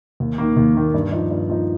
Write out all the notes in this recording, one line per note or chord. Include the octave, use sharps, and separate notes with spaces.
D#2
D#3 A#3
D#2
D#3 A#3
G2
F3 D#4
G2
F3 D#4